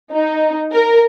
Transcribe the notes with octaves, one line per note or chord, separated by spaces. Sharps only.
D#4
A#4